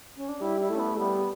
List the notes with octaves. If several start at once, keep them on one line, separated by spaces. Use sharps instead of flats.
C#4
D4
G3 E4
E4
A3
C#4
B3
G3 B3